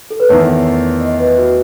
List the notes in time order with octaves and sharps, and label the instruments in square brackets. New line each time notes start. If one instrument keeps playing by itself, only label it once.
[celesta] A4
B4
[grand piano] E2 D#3 A3 [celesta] C#5
[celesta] D#5
B4
F#4